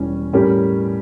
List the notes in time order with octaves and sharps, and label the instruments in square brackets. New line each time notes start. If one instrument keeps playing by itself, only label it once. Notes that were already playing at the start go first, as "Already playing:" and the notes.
Already playing: [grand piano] E1 E2 E3 G3 C#4
A2 G3 C#4 G4 A#4